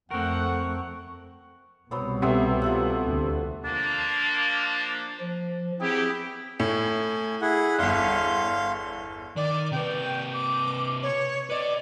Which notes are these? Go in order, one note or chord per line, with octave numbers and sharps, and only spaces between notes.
F2 A3 C4 A#4 F#5 C#6
C2 B2 F#3 B3 C5
C3 A3 B3 E5 C6
F4 A4 F#5
D2
F3 A#3 D4
F3
E3 F#3 C4 E4 G4 G#4
A2 G#5
E4 G#4 F#5
G1 E2 F5 C6
D#3 D5
C3 B4 G5
D6
C#5
B4 D5 D#5